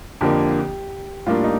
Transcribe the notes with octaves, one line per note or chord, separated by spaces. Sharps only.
F2 D3 F3 A#3 G4
A2 G3 A#3 D4 F4
D#4